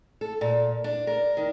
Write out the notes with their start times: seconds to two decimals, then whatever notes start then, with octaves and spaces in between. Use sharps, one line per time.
0.21 A4
0.41 A#2
0.84 D4
1.07 A#4
1.37 D#3